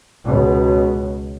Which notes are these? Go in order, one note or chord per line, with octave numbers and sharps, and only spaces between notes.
C#2 B2